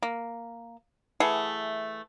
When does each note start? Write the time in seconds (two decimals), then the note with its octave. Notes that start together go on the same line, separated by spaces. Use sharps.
0.02 A#3
1.20 E3 A3 G#4 F#5